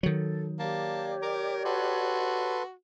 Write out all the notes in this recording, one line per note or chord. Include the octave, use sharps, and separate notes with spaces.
D#3 F#3 A4
A#3 G4 C#5 D5 A5
A#4 A#5 D6
F#4 A4 B4 C6